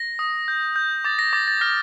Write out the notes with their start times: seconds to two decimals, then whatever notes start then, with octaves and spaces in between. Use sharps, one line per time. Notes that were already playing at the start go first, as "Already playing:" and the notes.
Already playing: A#6
0.19 D#6
0.48 G6
0.76 G6
1.04 D6 A6
1.19 A#6
1.33 D6 A6
1.48 A6
1.61 F6 A#6